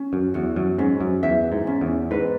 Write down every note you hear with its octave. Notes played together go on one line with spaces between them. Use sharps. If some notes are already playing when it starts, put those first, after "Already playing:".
Already playing: C#4
F#2
E2 F#4
F#2
G#2 C#4
F#2
E2 E5
G#2
C#4
E2
G#2 B4